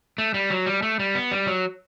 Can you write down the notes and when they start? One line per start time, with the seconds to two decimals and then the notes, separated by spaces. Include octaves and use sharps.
0.18 A3
0.34 G3
0.50 F#3
0.66 G3
0.82 A3
0.99 G3
1.15 B3
1.31 G3
1.47 F#3